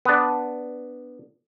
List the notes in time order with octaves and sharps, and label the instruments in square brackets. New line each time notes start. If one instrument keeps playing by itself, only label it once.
[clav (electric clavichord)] B3 D4